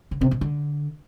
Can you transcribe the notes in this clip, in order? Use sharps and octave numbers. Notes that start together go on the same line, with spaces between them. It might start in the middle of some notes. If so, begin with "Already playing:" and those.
D3
C3
B2
D3